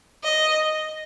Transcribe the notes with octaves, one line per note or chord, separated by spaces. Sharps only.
D#5